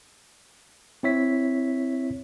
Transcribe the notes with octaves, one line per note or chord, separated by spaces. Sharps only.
C4 E4 C#5 E5 B6